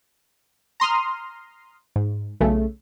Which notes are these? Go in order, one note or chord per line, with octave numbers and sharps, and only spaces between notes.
A#5 C6 D#6 F6
G#2
B1 C#3 A3